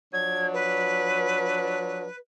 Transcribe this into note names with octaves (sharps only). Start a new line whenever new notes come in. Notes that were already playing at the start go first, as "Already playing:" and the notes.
F3 F#3 D4 G#6
B4